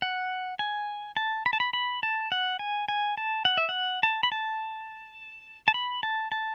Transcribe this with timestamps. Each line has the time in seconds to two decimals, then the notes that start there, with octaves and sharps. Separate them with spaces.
0.02 F#5
0.59 G#5
1.17 A5
1.46 B5
1.53 A5
1.60 B5
1.73 B5
2.03 A5
2.32 F#5
2.59 G#5
2.88 G#5
3.17 A5
3.45 F#5
3.57 E5
3.69 F#5
4.03 A5
4.23 B5
4.32 A5
5.68 A5
5.74 B5
6.03 A5
6.32 A5